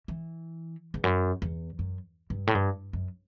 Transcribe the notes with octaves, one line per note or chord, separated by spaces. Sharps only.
E3
E2
F#2
E2
F#2
G2
A2
G2
F#2